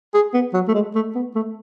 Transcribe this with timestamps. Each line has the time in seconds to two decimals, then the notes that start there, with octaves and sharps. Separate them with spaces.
0.14 G#4
0.34 B3
0.54 F#3
0.68 A3
0.74 G#3
0.95 A3
1.15 B3
1.35 A3